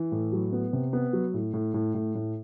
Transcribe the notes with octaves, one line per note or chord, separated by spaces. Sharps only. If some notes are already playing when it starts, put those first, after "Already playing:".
Already playing: E3
A2
F#3
B3
C3
B3
F#3
A2
A2
A2
A2
A2